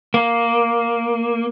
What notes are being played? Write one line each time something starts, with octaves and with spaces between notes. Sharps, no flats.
A#3